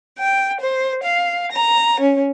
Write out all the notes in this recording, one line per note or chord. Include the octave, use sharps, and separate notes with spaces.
G5
C5
F5
A#5
C#4